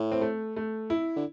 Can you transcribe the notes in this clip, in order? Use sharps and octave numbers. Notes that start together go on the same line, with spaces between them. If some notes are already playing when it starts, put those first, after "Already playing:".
Already playing: A2
C4
A3
A3
E4
D3